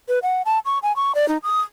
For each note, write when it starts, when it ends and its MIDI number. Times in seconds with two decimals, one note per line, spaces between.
0.09 0.19 71
0.23 0.42 78
0.46 0.59 81
0.65 0.79 85
0.83 0.95 80
0.96 1.15 85
1.15 1.28 74
1.28 1.38 63
1.43 1.61 87